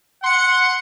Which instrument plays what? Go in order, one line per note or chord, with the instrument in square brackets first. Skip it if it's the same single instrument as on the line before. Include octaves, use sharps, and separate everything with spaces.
[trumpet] F#5 [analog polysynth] C6 C#7